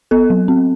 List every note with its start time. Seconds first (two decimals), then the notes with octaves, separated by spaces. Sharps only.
0.11 B3 A4
0.30 F#3
0.48 C4